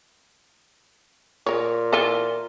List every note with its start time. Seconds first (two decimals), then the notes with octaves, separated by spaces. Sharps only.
1.46 A#2 A#4 C#5
1.93 E3 F4 A4